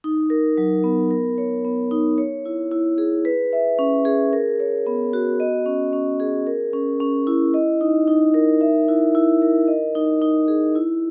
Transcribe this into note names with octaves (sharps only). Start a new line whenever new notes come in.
D#4
A#4
F#3
B3
A#4
C#5
B3
D#4
C#5
E4
E4
G#4
B4
E5
C#4
G#4
A#4
C#5
B3
F#4
D#5
C#4
C#4
G#4
A#4
C#4
C#4
E4
D#5
D#4
D#4
A#4
E5
E4
E4
A#4
D#5
D#4
D#4
G#4
E4